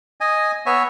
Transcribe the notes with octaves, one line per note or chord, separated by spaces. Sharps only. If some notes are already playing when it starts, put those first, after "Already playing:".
D#5 G#5
B3 C#5 E5 G#5